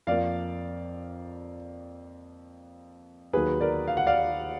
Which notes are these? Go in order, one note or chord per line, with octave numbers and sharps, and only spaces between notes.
F2 F3 A#3 D5 F5
D#2 D#3 F#3 A#3 G#4 B4
A#4 D5
F5
F#5
D5 F5